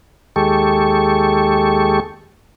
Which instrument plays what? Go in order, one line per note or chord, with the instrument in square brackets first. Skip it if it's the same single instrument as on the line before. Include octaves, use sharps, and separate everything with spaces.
[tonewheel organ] D#2 G#3 G4 A4 C#6